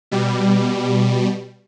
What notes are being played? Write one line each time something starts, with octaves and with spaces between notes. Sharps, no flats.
B2 G3